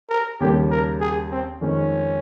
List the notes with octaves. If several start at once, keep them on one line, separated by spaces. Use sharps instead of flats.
A#4
D#2 C#3 G3 A#3 G4
A#4
G#4
C4
F2 D#3 G#3 C#4